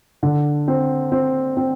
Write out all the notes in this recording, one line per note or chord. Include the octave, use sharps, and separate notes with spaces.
D3
C4
C4
C4